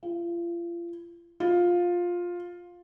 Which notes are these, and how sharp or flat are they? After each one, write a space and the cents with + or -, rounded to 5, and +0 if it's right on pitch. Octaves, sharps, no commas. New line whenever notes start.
F4 -35
F4 +10